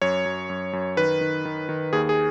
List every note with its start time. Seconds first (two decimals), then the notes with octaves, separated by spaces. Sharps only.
0.02 F#2 C#5
0.26 F#2
0.50 F#2
0.73 F#2
0.97 D#3 B4
1.21 D#3
1.45 D#3
1.69 D#3
1.93 D#2 G#4
2.09 G#4